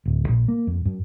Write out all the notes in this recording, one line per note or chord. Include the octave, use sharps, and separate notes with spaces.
D1
A#1
A#3
F2
F#2